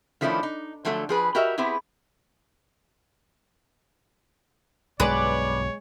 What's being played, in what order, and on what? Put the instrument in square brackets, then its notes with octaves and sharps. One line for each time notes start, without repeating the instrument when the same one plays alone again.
[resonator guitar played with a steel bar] D#3 F3 A3 C#4 D4 E4
D#4
D3 F3 F#3 A3 A4
F3 G#4 B4
F#4 G4 A#4 D#5 E5
B3 C4 E4 G4 G#4
[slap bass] B1 G2 [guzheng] G#3 [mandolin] B4 D5 [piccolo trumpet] C#5